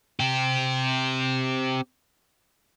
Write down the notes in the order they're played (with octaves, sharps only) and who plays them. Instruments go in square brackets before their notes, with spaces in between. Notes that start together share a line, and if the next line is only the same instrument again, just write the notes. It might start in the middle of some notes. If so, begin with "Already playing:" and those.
[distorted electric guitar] C4 G4